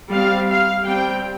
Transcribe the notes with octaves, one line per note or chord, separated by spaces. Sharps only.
G3 C4 F5
F5
G3 C4 G5